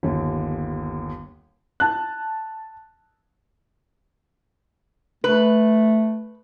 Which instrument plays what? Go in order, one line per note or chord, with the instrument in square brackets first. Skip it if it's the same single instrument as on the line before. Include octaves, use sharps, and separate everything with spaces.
[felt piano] G1 D#2
[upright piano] A5 F#6
[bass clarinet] A3 [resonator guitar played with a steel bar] B4